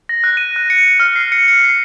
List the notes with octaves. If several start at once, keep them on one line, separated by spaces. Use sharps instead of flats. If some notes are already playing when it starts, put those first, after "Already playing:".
A#6
F#6
D#7
F#6
C#7
F6
C7
C#7
C#7
C7